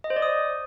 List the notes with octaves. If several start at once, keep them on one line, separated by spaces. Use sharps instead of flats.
D#5
C5
D5
D#6